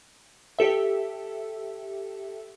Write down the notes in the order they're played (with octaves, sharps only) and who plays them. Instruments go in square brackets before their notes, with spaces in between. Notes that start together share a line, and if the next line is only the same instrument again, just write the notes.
[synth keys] G4 A4 E5